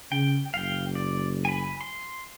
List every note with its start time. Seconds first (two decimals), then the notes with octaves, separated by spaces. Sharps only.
0.12 C#3 G5
0.54 F#1 F5 G5
0.95 D5
1.45 G#5 B5
1.81 C6